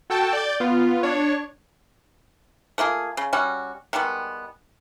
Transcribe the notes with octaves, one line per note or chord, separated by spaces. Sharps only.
F#4 A4 G5 A5
D5 G6 A6
B3 F4
D4 C#5
A3 A#3 F4 G#4
C#3
G3 C#4 F#4
D#3 G3 G#3 B3